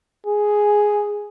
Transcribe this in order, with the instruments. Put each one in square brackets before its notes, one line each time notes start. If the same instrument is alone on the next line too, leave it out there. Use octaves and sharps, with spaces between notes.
[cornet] G#4